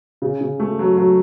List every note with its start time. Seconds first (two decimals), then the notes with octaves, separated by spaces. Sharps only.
0.22 C#3
0.41 C#3
0.60 A3
0.79 F#3
0.97 F#3